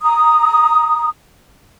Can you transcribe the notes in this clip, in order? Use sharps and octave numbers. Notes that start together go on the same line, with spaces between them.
A#5 D#6